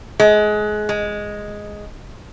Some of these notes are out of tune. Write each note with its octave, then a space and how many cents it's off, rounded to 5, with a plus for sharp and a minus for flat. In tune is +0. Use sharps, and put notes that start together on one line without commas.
G#3 +25
G#3 +0